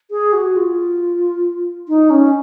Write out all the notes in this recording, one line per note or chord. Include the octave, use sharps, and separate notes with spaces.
G#4
F#4
F4
D#4
C#4